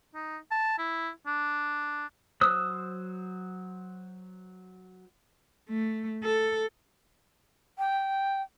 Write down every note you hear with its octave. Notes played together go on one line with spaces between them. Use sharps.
D#4
A5
E4
D4
F#3 C5 D#6 E6 F#6
A3
A4
G5